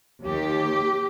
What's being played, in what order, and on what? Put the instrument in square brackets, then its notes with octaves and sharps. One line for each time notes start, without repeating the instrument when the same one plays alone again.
[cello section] D#2 D#3 G4